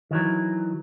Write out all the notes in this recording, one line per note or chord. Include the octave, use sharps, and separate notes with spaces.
D#3 E3 F#3